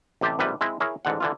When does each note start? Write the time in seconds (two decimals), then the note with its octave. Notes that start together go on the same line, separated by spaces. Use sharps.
0.21 A1 C3 G4 C5 A5
0.39 A#1 G#2 C3 G3 B4
0.61 G#3 C4 E4
0.80 E4 G#4 A#4 C#5
1.05 A1 G#2 D3 F#5
1.20 D3 E3 F4